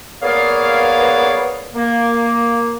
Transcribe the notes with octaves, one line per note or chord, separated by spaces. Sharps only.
A#3 B3 G#4 C#5 D5 F5
A#3